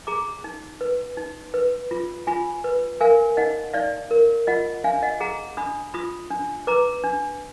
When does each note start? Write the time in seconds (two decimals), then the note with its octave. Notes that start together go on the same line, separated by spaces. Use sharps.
0.07 G#4 A#5 D6
0.44 D#4
0.81 B4
1.17 D#4
1.54 B4
1.91 F4
2.27 F4 G#5 B5
2.64 B4
3.01 A#4 F5 G#5
3.37 D#4 D#5 F#5
3.74 D#4 D5 F5
4.11 A#4
4.47 F4 D#5 F#5
4.84 D4 F5 G#5
5.02 D#5 F#5
5.20 G#4 F#5 A#5
5.57 D4 B5 D#6
5.94 F4 B5 D#6
6.30 D4
6.67 B4 A#5 D6
7.04 D4